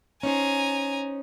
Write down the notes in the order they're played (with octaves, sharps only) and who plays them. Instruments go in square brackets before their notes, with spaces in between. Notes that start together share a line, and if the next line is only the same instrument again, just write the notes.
[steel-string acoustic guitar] C#4 D#4 C5 [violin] G#5 A#5